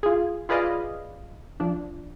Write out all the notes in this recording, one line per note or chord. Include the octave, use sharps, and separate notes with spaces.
F4 G#4
F4 G#4 B4 D5 D#5 F5
F3 D4